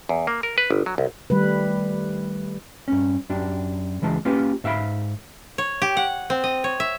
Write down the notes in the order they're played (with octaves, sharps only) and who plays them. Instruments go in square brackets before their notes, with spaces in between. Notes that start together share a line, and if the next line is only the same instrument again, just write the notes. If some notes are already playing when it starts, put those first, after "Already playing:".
[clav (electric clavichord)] E2
A#3
A#4
B4
G1
F#3
C2
[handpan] D#3 G3 A3 B4
[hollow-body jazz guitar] G2 C#4
F#2 D4 G4
C#2 E3 G#3 A5
A#3 C#4 F4 G4 B4 F5
G#2 E5 F5 B5
[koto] C#5
G4
F#5
C4
D#5
C#5
E5